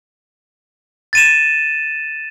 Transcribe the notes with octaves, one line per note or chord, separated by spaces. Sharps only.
A6 D#7 E7